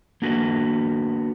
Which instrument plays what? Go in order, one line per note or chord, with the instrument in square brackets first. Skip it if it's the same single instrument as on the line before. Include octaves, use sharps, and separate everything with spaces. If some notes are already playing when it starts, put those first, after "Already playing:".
[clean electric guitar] A#3 B3 D4 F#4